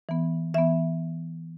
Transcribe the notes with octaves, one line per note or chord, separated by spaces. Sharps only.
E3 B3
E3 B3 E5